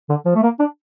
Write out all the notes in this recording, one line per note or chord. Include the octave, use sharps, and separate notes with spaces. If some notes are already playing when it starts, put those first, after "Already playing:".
D3
F3
A3
A#3
D4